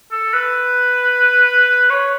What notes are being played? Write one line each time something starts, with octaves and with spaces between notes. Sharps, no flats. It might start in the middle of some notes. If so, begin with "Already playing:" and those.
A4
B4
C#5